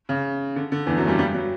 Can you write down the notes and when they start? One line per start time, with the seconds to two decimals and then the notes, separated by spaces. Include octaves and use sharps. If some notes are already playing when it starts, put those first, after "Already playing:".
0.09 C#3
0.56 D3
0.72 D3
0.86 E2 E3
0.97 F#2 F#3
1.07 G2 G3
1.18 G2 G3
1.34 F#3